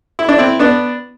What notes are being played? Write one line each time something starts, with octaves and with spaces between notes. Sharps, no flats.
E4
D4
C4 E4
B3 D4